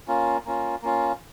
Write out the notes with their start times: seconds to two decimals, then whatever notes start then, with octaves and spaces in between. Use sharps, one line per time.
0.08 A#3 C#4 F4
0.45 A#3 C#4 F4
0.82 A#3 C#4 F4